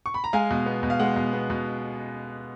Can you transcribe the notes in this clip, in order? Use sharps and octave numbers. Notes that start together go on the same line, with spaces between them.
C#6
B5
A#5
G#3 F5 G#5
B2
B3
B2
F5
G#3 F#5
B2
B3
B2